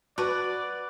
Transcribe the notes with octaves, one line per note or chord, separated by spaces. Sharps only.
F#4 B4 D5